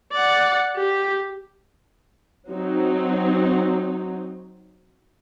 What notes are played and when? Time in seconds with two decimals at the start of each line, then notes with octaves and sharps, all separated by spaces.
0.12 D5 F#5
0.76 G4
2.49 F#3 C4 D#4